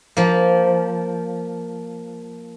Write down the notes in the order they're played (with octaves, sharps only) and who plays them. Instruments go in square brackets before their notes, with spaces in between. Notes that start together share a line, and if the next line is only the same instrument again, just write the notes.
[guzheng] F3 A#3